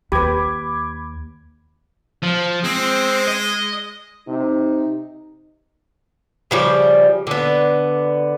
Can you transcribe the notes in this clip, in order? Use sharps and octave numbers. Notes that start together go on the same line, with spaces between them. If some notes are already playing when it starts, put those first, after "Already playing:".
D#2 G4 B4 B5 D6 G#6
F3
G#3 C4
D#5
C3 D#4
C#3 F3 G3
D3 B3